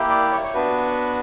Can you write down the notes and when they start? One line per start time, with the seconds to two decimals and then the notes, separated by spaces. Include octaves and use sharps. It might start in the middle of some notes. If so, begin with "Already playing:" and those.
Already playing: A#3 E4 G4
0.09 D5
0.32 C#5
0.43 C#5
0.54 B3 D4 F#4 B4